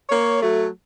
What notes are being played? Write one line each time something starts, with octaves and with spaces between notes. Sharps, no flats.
A#3 C#5
F#3 A3